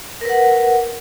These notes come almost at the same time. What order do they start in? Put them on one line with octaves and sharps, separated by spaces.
A#4 B4 F#5